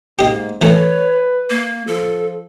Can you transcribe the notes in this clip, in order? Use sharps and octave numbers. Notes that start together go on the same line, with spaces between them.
G#2 A#3 G4 D#5
E3 A3 B4 C#5
A#3
F3 A4